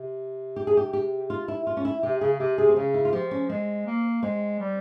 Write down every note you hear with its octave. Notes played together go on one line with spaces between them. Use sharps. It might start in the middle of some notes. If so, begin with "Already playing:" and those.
Already playing: C3
G4
G#4
G4
G4
F4
E4
F4
C#4
E4
C3 G4
C#3 G#4
C3 G4
C3 G#4
C4
C#3 C#4
E4
F4
F3 G4
C#4
G#3 C4
A#3
G#3 C4
G3